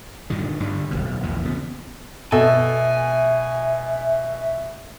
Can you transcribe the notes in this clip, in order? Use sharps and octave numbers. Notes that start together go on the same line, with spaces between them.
G2 A#2 D3 D#3
G2 D3 G3
D1 A#1 B2
A#1 E2 A#2
C#3 G#3 B3
B2 A4 E5 G#5